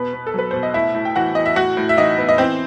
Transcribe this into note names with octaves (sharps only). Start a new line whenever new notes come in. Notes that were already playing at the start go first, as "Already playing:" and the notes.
Already playing: B2 B3 B4
B3
A4
F#3 B4
B2 C5
D#5
A2 E4 E5
A2
G5
E3 F#4 F#5
E3 D#5
E5
A2 F#4 F#5
A2
E5
E3 D#4 D#5
B3
D#5
E3 C4 C5